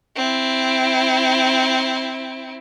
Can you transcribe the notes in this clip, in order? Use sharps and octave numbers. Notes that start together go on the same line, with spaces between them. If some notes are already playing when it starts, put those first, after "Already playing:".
C4 E4